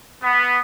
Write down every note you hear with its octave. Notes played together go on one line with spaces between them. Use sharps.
B3